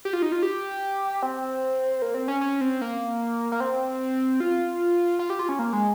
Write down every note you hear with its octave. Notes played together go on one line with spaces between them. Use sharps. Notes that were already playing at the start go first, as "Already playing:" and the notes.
G4
F4
D#4
F4
G4
C4
A#3
C4
C#4
C#4
C4
A#3
A#3
C4
F4
F4
G4
F4
C#4
A#3
G#3